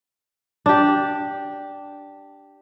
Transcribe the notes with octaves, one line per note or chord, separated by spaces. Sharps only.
D4 G4